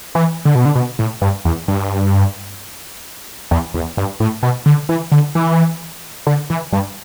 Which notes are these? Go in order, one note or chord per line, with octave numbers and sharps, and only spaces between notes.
E3
D3
B2
D3
B2
A2
G2
E2
G2
E2
E2
G2
A2
B2
D3
E3
D3
E3
D3
E3
G2